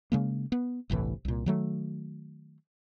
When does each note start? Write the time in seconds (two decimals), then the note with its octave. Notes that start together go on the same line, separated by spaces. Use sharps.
0.12 C#3 G#3 A#3
0.52 B3
0.90 G1 C2 A2 E3
1.25 C2 A#2
1.46 D#3 F#3 A3